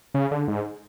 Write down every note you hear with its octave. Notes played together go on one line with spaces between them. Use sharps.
C#3
D3
G#2